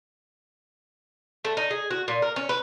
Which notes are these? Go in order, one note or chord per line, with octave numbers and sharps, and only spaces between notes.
A3
D#4
G#4
F#4
A#2
A#4
C#4
B4